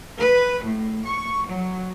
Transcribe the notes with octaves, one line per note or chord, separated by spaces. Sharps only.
B4
A2
C#6
F#3